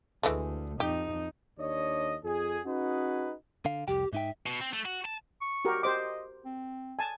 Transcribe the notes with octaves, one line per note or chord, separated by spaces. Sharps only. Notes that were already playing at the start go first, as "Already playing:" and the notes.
D2 E3 G#3 A3
F2 D#4 G4
D#2 D4 C#5 D#5
F2 G#4
C#4 D#4 F#4 G#4 B4
D3 F5
C2 F2 G4 G5
G#2 D#4 E5 G5
B2
C4
A3
F#4
A5
C#6
F#4 G4 A#4
G4 C5 D#5 D6
C4
G#5 A5